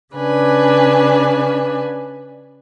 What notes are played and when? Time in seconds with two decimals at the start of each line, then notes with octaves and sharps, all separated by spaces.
0.14 C#3 D4 B4 G#5